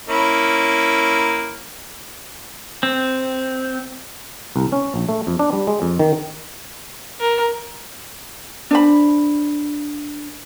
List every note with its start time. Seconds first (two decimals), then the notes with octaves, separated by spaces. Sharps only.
0.09 A#3 C#4 E4
2.83 C4
4.56 C2
4.72 C#4
4.94 A#1
5.09 A3
5.27 F2
5.39 D4
5.53 G3
5.67 G#3
5.82 F2
5.99 D#3
7.20 A#4
8.71 D4 C5 B5